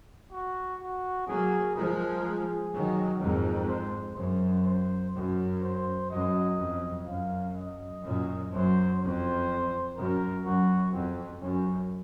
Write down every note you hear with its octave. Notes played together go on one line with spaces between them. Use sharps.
F#4
F#4
F#3 A#3 G#4
F3 G#3 A#4
G#4
D#3 F#3
F2 G#2 A#4
C5
F#2 C5
C5
F#2
C5
F#2 D#5
F2
F#2 F5
D#5
F#2 A#2
F#2 C5
F2 C5
F#2 A#4
F#2 F#4
F2 C4
F#2 C#4